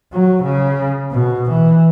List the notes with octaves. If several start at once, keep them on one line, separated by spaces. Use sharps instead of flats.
F#3
C#3
B2
E3